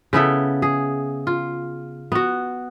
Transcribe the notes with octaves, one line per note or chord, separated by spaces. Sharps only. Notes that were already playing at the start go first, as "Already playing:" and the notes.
C#3 B3 E4 A4
G#4
F4
B3 F#4